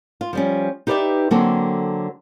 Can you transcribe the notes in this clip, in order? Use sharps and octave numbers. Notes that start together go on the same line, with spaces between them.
F4
F3 G3 C#4
D#4 G4 B4 C#5 D5 E5
D3 F#3 A#3 C4 G#4 A4